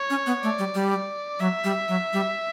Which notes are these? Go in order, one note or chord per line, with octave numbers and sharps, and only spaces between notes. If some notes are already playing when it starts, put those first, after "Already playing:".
Already playing: C#5
C#4
B3
A3 D5
G3
G3
D5
F#3 E5
G3
F#3
G3